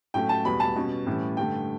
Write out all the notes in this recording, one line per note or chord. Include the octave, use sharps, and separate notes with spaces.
A2 F#3 A3 C#4 G5
A5
E2 B2 G3 B5
A5
B2 G3 C#4
A2 E3 G3 C#4
G2 D3 A3 G5